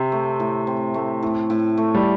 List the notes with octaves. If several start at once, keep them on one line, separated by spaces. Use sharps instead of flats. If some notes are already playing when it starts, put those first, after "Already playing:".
Already playing: C3 C4
A3
A2
C4
A3
A2
A2
A3
G3